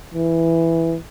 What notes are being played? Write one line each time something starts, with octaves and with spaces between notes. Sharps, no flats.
E3